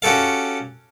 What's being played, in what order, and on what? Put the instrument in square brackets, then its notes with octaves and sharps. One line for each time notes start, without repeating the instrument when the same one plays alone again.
[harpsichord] C#4 F#4 G4 A4 F5